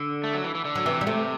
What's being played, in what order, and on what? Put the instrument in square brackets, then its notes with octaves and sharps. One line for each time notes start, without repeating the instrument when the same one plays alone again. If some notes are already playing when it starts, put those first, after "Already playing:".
Already playing: [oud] D3
[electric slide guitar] A3
F#3
E3
E3
D3
[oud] F#3
[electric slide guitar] C3 [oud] E3
[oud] G3
[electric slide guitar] C3 [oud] A3